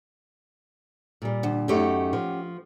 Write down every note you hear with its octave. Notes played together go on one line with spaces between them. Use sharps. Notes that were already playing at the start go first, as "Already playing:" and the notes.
A#2 G3
D3
F#2 A3 C#4 D#4 G4 F#5
F3